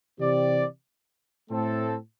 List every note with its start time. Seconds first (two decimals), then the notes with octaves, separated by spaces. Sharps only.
0.20 C3 E3 C4 G4 D5
1.50 A2 A3 C4 A4